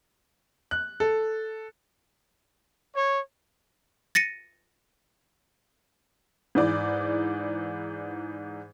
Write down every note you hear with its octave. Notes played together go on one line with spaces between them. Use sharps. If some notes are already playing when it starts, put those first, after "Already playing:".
F#6
A4
C#5
A6 A#6 C#7 D#7
G#2 E3 D5